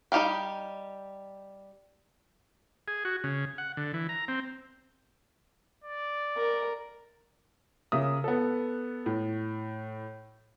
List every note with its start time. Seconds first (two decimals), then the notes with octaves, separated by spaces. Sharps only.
0.12 G3 D#4 G4 F5 G5
2.88 G#4
3.05 F#4
3.24 C#3
3.58 F#5
3.77 D3
3.93 E3
4.09 A#5
4.28 C4
5.84 D5
6.37 A#4
7.92 C#3 A#3 E5 D#6
8.24 B3 A4
9.06 A2